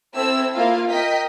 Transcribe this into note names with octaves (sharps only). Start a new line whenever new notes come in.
C4 E4 A4 E6
A#3 E4 F4 F5
A#4 D#5 G5 B6